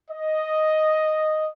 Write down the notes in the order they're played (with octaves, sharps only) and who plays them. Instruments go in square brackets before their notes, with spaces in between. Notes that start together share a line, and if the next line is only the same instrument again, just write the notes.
[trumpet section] D#5